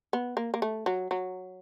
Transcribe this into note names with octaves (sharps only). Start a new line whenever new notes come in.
B3
A#3
A#3
A3
F#3
F#3